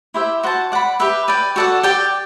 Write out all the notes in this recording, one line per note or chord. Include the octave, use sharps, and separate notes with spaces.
E4 G4 C5 E5
F#4 C5 F#5 A5
D5 F#5 B5
G4 B4 E5
B4 D5 G5
F#4 A4 D5 F#5
G4 D5 G5